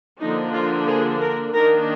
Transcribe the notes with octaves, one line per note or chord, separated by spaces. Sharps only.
D3 F3 A#3 D4 D#4
F4
G#4
A#4
D#3 A#3 D4 A#4